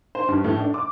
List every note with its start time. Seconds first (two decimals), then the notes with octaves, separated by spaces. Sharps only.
0.15 C5
0.28 G2
0.44 A2
0.60 D4
0.74 D6